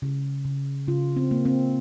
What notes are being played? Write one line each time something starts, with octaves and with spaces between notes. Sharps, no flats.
C#3
C#3
C#3 F4
C4
A#3
C4